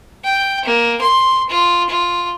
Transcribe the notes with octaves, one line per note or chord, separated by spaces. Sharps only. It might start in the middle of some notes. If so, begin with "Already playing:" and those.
G5
A#3
C6
F4
F4